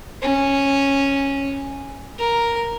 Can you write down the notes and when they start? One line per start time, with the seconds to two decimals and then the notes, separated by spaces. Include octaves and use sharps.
0.22 C#4
2.19 A#4